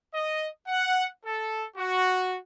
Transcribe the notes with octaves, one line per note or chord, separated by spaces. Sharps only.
D#5
F#5
A4
F#4